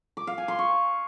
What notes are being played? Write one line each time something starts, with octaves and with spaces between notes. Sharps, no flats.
D6
F5
G#5
C6
C#6